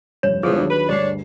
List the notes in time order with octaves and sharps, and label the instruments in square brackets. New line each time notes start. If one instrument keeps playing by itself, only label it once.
[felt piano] F1 G2 E7 [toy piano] C#5
[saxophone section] E2 F3 [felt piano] D3 G3 G#3 [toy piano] G#4
[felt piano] D#2 F#3 D4
[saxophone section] B4
[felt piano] D2 G2 C7 [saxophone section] D4 C#5